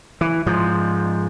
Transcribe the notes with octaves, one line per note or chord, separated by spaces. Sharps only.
E3
G#2 F3